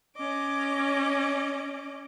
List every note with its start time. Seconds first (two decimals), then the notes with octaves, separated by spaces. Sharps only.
0.16 C#4 D#5 D6